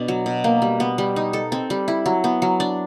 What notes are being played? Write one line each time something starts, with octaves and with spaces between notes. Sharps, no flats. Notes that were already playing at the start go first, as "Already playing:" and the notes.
Already playing: B2 B3 D4
F#3
B2
A#3
G3
B3
G3
D#4
A4
C4
G3
E4
F#3
B3
F#3
D4